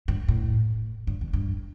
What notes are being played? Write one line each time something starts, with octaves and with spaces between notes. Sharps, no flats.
G2
A2
G2
E2
G2